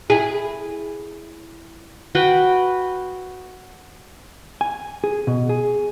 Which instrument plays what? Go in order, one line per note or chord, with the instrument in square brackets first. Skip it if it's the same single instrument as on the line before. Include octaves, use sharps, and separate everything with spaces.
[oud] E4 G#4
[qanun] F#4 B4 G5
[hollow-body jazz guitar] G#5
G#4
B2
G#4